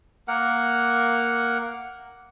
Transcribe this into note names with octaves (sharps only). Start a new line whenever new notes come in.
A#3 A#4 F#5